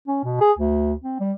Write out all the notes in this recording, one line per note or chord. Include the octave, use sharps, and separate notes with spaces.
C#4
B2
G#4
D2
C4
G3